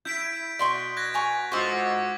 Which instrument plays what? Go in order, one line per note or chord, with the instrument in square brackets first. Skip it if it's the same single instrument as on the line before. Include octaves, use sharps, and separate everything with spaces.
[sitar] E4 [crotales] G6 B6 D7
[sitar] B2 [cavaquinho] D5 C6 C#6
[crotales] F#6 G#6 A#6
[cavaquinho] G#5 A#5 C#6
[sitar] G#2 F4 F#4 [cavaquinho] C5 D#5 [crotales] C#6 D6 E6